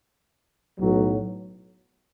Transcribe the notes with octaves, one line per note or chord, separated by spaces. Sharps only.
B1 A2 F#3